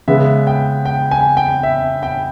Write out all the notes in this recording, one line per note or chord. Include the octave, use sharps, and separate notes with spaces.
C#3 G#3 B3 E5
G5
G5
G#5
G5
E5
G5